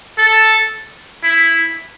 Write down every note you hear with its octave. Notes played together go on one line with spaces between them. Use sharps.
A4
E4